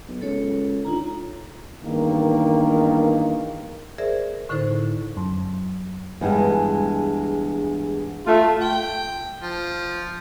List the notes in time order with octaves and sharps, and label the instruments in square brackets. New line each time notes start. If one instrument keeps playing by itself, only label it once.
[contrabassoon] B1
[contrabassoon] C#2 [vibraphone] A4 C#5
[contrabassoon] D3 [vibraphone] D#4 F4 A#5
[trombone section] E2 G2 D#3 A#3
[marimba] G#4 A#4 C5 D5 E5
A2 D3 D#4 E4 A4 C5
[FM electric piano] F#2
[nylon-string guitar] E2 G2 G#3
[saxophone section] A3 F4
[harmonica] G5
F3